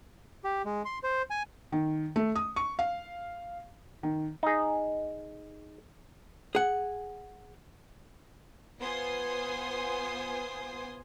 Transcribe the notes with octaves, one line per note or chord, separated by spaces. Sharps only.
G4
G#3
C6
C5
G#5
D#3
A3
D#6
C#6
F5
D#3
D#4 G#4
G#4 F#5
B3 F4 C5 G#5 C6 D#6